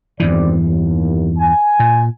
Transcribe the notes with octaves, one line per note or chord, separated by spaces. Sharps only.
G#1 E2 G2 E3 C4 D5
D#2
G#5
A#2